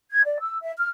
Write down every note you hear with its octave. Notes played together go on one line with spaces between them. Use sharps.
G#6
D5
E6
E5
F6